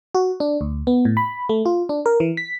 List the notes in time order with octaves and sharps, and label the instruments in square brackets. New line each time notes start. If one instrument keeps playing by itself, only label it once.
[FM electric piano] F#4
D4
D2
B3
A2
B5
A3
F4
D4
A#4
E3
B6